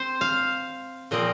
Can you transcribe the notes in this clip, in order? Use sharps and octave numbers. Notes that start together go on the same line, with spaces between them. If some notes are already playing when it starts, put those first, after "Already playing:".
Already playing: C4 C5
F5
A#2 F3 C4 D#5